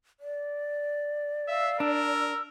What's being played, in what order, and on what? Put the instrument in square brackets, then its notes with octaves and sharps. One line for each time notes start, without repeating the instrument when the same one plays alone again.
[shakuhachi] D5
[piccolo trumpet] E5 [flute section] F5 E6
[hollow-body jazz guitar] D4 [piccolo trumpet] A#4 [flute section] E6